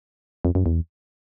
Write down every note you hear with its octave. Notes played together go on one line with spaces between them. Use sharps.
F2
F#2
E2